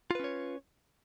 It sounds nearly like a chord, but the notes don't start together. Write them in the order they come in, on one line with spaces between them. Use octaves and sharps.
F4 B4 C#4 C#5